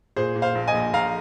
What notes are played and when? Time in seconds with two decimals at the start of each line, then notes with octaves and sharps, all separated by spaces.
0.16 A#2 G#4 C5
0.36 A#2
0.42 C5 F5
0.55 A#1
0.68 D#5 G#5
0.74 A#1
0.93 A#1 F5 A#5